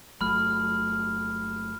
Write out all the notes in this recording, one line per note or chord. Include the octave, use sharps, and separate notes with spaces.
G1 F#3 A3 B5 F6